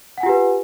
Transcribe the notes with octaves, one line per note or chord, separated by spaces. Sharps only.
F4 G4 B4 F#5 G#5